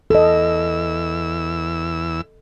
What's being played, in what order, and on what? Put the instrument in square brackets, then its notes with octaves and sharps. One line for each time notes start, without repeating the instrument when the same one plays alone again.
[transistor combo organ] E2 E6 [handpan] A4 D#5